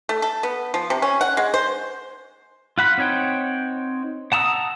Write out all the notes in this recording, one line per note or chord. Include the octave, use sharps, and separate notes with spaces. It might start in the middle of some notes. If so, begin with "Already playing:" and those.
A3
A4
B3
F3
C3
C#4
F#5
G#3
C5
F4 F#5 B5
C4 D#4 C#5 F#5 G5
F#5 A5 A#5 D#6 E6